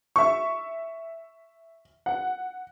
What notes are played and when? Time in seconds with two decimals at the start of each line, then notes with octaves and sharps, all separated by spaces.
0.16 E5 C#6
2.06 F#5